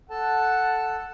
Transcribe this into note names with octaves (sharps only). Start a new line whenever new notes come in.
A4 F#5 A5